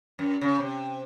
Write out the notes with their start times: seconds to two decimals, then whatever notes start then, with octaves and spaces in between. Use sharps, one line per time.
0.19 F#2
0.41 C#3
0.59 C3